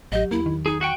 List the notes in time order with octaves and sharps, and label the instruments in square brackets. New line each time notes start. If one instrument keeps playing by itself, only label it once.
[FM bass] A1 [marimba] F#3 G4 [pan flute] D#5
[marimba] E2 [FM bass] A#3 [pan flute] E4
[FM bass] D#3
[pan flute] D#4 [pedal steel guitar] G#4
[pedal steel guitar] F#4 F#5 G5 [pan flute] C#6